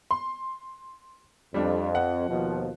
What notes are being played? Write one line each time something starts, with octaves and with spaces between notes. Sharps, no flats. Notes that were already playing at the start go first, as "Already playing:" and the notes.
C6
F2 G3 D4
F#5
D#2 B2 F3